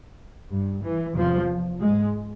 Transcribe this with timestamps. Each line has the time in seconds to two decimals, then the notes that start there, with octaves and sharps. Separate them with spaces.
0.51 G2
0.84 E3
1.15 E2 C3 F3
1.80 G#2 G#3